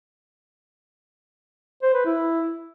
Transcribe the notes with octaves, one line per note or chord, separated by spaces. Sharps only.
C5
B4
E4